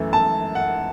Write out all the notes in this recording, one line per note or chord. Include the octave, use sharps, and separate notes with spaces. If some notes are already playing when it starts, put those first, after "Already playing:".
Already playing: F#2 E3 A3
A5
F#5